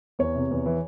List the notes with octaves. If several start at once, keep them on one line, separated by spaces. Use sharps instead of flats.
E2 C#5
C3
E2
E3